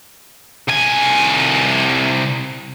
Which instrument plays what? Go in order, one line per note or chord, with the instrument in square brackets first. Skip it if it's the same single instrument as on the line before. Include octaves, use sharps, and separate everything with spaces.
[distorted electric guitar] C2 G#5